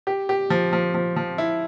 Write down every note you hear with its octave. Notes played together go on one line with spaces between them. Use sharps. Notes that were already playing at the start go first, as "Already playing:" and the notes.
G4
G4
F3
F3
F3
F3
E4